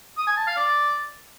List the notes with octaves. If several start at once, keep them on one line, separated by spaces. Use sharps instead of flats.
D#6
G#5
A5
F5
D5